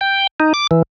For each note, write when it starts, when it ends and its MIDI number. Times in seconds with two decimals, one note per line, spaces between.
0.01 0.27 79
0.40 0.53 63
0.54 0.67 86
0.71 0.82 52